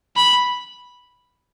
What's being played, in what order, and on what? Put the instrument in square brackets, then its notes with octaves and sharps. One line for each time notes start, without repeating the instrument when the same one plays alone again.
[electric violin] B5